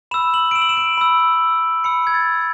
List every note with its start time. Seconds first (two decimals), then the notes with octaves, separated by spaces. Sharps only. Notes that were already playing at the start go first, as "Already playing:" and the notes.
0.11 B5 E7
0.14 E6
0.34 F#7
0.51 D7
0.55 E7
0.62 F#7
0.69 E7
0.77 D7
0.97 B5 E6
1.84 B5 E6 C#7
2.07 G#6
2.14 A6